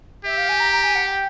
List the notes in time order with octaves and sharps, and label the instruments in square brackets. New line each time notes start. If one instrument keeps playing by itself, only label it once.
[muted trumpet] G4 [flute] E5
[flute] F5
G#5
A#5
A#5
G#5
F#5
G5